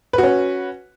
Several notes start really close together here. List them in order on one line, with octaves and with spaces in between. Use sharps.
B4 F#4 C#4